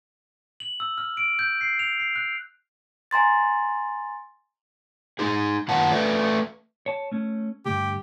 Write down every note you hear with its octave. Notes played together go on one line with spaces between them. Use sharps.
F#7
E6
F6
D7
G6
C7
F7
C7
F#6
G#5 A#5 C6 A6
D#4 G#4
F#2 D#3 F4 F#5 A5
A3 B4 D5
C#5 A5
A3 C#4
D2 G2 G4